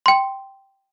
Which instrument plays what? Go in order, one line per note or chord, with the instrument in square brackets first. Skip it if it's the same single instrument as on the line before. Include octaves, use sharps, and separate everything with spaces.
[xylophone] G5 C6